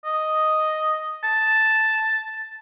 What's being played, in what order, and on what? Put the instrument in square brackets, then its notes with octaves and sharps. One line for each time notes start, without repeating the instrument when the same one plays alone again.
[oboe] D#5
A5